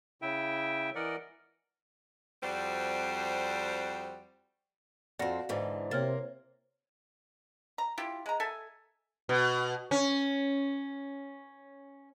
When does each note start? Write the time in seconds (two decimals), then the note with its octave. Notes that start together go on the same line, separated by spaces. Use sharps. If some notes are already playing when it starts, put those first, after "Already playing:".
0.22 C#3 E4 E5 G5
0.95 E3 A#4 D5 D#5 F#5
2.42 F2 G3 C4 F#4 C5 D5
5.19 F2 C4 F#4 D5 F5 F#5 A#6
5.49 G#2 D3 E3 C5
5.91 C3 A#3 C4 C#5 F6 A6
7.78 A#5
7.98 E4 F4 G4
8.26 G#3 A#5
8.40 A4 E5 G#5
9.29 B2
9.91 C#4